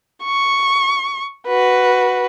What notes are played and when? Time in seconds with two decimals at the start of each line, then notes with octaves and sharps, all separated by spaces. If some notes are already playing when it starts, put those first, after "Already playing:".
0.24 C#6
1.47 F#4 B4